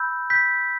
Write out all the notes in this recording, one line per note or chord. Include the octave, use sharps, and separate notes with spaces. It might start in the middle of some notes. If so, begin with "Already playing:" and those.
Already playing: B5 E6 G6
G6 B6